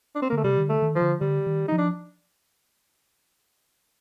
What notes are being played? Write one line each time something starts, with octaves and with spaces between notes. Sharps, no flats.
D4
C4
A#3
D3 A3
C3 G3
D#3
D3
A3
D#3
F3
D3
D3 G3
D#3
F3 D#4
D4